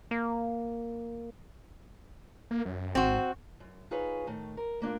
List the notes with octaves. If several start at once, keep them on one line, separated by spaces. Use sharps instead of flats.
A#3
A#3
F#2
G#1 C4 F#4
F#2
D#4 F4 G#4 B4 C#5
A2 D#3 A3
A#4
D2 A#3 D4 F4